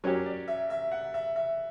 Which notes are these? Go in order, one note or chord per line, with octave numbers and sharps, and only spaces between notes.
F#3 C#4 G4 A#4
D5
E5
E5
F#5
E5
E5